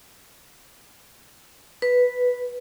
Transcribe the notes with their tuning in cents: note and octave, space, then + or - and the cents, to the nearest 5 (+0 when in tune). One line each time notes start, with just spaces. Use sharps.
B4 +0